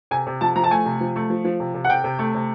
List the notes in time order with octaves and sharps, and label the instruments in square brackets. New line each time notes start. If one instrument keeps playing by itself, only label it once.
[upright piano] C3 G#5
C3
F3 A5
F3 A#5
A5
A3 G#5
C3
F3
A3
F3
F3
C3
C3
F#5
C3 G5
C3
A3
C3